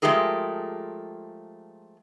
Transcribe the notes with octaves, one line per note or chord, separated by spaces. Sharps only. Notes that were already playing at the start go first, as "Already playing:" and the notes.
F3 G#3 A3 G4 G#4 A#4